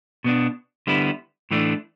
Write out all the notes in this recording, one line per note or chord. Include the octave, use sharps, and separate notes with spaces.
B2 B3 D4
D3 G3 B3 E4
A2 E3 A3 D4